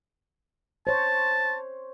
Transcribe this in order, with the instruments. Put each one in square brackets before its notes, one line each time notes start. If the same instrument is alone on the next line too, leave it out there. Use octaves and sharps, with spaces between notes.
[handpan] C5 C#5 [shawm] A5